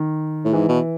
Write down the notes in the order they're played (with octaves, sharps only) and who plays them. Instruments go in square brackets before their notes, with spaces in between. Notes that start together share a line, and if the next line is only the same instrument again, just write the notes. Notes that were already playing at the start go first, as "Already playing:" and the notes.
Already playing: [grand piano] D#3
[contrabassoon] A2
[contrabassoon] G#2 [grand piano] E3
[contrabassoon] B2